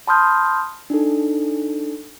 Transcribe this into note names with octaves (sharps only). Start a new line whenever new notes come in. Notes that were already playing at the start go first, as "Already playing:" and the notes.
A5 B5 C6 D#6 F6 G6
D4 D#4 A4